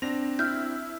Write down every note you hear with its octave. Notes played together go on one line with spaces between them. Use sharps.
C4 D4 A#6 F7
E4 F6 G6